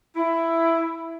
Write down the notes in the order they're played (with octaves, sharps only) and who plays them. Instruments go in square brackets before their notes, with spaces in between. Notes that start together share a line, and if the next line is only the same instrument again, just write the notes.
[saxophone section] E4